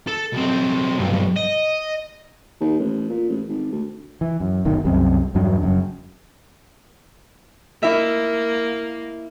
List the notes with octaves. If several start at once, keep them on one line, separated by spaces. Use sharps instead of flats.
A4
B1 C4
B1 G2
D#5
D#2
A1
A#2
A1
G#1
D2
E3
F#2
G1 B2 D#3
C2 F#2 C3
E2 G2 F#3 D4
F#1 F#2
A#3 E4 E5